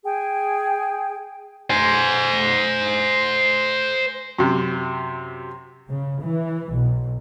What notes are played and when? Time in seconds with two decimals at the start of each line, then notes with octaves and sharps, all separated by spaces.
0.03 G#4 G5 G#5
1.70 C5 G#5
4.39 F#2 C3
5.89 C#3
6.23 E3
6.74 B1